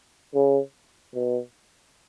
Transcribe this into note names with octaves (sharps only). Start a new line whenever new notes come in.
C#3
B2